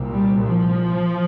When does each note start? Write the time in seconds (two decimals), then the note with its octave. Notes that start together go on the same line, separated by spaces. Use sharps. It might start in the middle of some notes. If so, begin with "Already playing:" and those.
Already playing: C2 A#2
0.12 G3
0.44 F3